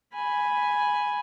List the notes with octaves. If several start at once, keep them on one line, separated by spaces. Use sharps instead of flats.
G#5 B5